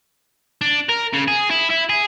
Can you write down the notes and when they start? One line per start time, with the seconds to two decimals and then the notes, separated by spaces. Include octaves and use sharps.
0.61 D4
0.89 A#4
1.13 C#3
1.28 G#4
1.51 E4
1.70 E4
1.89 G#4